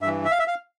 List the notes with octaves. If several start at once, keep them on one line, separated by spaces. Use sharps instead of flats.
G2 E3 E5
E5
F5
E5
F5